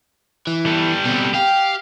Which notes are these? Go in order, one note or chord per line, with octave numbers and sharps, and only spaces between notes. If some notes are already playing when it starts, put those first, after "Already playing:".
E3
G3 A4
B2 C4
G4 F5